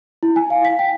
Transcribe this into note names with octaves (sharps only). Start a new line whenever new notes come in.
E4
G#5
F5
B6
G5